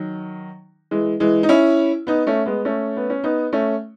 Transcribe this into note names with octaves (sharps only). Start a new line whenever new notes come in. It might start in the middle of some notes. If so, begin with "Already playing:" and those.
Already playing: D#3 F#3
E3 G#3
E3 G#3
D#4
C#4 E4
B3 D#4
A3 C#4
G#3 B3
A3 C#4
B3
C#4
B3 D#4
A3 C#4